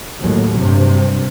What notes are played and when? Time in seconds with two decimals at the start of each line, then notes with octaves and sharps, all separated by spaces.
0.21 D#2 A2 F#3
0.57 G2 C3